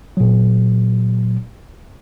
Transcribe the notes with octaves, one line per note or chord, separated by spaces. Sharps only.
A#2 F#3